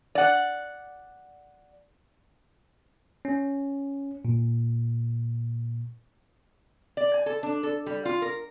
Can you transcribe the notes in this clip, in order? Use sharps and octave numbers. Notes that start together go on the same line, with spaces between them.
D5 F#5
C#4
A#2
D5
G#5
A4
D4
A4
G3
F4
A#4